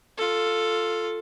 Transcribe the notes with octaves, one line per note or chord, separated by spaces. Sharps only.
F4 A4